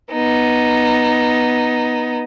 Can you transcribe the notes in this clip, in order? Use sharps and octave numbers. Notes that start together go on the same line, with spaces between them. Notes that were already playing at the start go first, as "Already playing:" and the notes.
B3 D#4